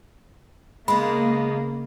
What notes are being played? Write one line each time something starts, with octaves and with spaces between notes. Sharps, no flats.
C#3 G#3 A#3 B3 B5